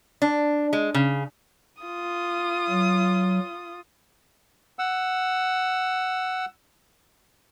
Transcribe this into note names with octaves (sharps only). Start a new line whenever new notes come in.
D4
G#3
C#3
F4 D#6
F#3
F#5 E6